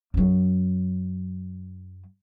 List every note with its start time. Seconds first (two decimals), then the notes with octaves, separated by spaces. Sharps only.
0.14 F#2 F#3